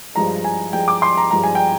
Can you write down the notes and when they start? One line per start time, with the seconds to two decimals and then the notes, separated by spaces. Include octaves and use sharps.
0.15 G2 F3 G#3 A#5
0.44 G#5
0.73 G2 F3 G#3 G5
0.88 D6
1.02 C6
1.17 A#5
1.31 G2 F3 G#3 A#5
1.43 G#5
1.55 G5